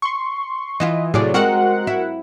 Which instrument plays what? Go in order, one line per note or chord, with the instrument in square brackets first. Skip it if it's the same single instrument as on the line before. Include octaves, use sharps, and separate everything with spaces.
[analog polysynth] C6 C#6
[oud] E3 E4 F4 [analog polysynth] D#5
[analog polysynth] A2 D5 [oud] C3 F#3 G#4
[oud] G#3 C4 [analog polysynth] F#4 A#4 F#5
[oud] E4